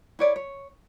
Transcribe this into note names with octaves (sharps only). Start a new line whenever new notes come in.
E4 C#5 D5
C#5